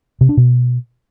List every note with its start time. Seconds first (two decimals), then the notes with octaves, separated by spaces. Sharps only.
0.21 C3
0.29 D4
0.37 B2